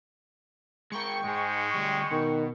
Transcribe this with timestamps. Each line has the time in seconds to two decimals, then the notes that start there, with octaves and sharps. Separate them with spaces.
0.92 G#3 A#4 G5 C#6 C#7
1.24 G#2 G#3 G#4
1.75 D2 G3
2.11 B2 D#3